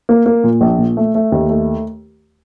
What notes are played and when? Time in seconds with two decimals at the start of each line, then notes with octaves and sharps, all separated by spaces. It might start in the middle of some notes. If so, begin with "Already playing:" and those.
0.09 A#3
0.26 A#3
0.44 A#2
0.61 A#1
0.78 A#2
0.97 A3
1.15 A3
1.32 D#2
1.49 A3